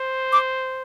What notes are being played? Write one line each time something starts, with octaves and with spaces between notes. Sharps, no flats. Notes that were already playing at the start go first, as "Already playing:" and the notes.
Already playing: C5
D6